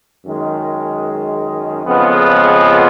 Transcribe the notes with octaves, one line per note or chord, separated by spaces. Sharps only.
F#2 D#3 G#3
F2 C#3 G#3 B3 F4